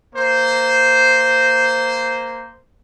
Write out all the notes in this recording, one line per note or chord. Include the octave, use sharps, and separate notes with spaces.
A#3 C5